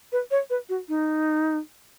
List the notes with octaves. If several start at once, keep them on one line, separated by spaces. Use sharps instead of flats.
B4
C#5
B4
F#4
D#4